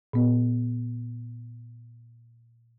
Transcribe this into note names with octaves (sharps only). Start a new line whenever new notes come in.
A#2 B3